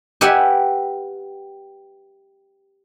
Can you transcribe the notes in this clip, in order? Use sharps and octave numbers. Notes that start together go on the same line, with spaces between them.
G4 B4 E5 F#5 G#5